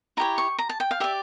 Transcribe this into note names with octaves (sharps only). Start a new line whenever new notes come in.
E4 G4 C#5 A#5
C#6
A#5
A5
G5
F5
G4 D5 E5